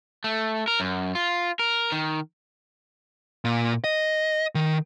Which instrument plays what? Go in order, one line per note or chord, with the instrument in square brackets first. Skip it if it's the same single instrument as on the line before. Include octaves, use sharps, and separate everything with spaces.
[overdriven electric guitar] A3
A#4
F#2
F4
A#4
D#3
[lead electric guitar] A#2
D#5
D#3